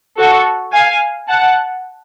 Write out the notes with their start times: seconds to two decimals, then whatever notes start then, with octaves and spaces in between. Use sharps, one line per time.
0.18 F#4 A4
0.72 F5 G#5
1.28 F#5 A5